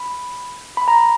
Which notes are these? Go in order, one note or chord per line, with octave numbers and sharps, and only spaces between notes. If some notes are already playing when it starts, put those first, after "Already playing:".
Already playing: B5
B5
A#5